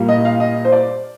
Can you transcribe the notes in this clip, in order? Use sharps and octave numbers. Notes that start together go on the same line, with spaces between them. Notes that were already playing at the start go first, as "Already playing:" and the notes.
Already playing: A#2 G3 A#3
D#5
F5
D#5
C5
D5